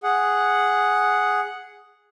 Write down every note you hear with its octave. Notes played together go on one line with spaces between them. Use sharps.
G#4 F#5